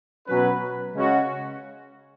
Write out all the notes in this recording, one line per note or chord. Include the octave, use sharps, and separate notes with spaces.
B2 F#3 C#4 B4
C#3 G#3 C#4 F#4